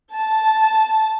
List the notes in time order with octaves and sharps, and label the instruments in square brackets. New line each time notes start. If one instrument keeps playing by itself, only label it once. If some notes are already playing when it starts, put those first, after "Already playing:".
[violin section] A5